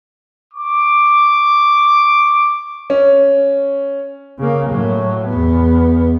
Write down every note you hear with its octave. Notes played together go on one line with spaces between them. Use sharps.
C#6 D6
C#4
C#3 A#3
A2 F#3
E2 B3